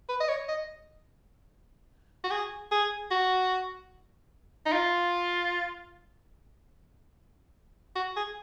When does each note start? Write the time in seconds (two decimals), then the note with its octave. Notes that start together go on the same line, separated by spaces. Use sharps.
0.09 B4
0.20 D#5
0.29 C#5
0.49 D#5
2.24 F#4
2.31 G#4
2.71 G#4
3.11 F#4
4.66 D#4
4.73 F4
7.96 F#4
8.16 G#4